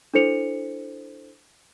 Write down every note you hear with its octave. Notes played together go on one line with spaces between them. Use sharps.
D4 E4 A4 C5 C#7 F7